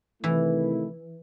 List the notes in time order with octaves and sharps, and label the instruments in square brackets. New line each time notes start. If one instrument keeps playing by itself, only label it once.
[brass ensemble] C3 D#3 A3 E4 [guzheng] E3